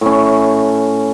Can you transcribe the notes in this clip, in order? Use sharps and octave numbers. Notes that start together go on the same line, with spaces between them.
A2 C#4